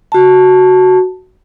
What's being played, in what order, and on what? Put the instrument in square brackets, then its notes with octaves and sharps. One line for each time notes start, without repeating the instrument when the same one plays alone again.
[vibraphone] F#4 A5